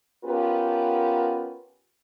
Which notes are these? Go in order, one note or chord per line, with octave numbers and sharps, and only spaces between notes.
B3 C#4 F4 G4 A#4 B4